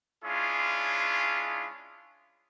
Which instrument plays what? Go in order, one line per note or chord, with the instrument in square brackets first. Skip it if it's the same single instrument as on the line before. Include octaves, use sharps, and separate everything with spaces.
[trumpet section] G#3 C#4 D4 E4 F4 G#4